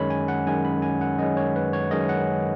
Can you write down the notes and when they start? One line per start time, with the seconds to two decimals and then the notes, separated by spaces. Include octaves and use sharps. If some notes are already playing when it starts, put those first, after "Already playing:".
Already playing: F#2 D#3 G#3 C#4 C#5 B5
0.10 G#5
0.28 F#5
0.46 F#2 D#3 G#3 C#4 G#5
0.65 B5
0.82 G#5
1.01 F#5
1.19 F#2 D#3 G#3 C#4 D#5
1.37 C#5
1.56 B4
1.73 C#5
1.91 F#2 D#3 G#3 C#4 D#5
2.09 F#5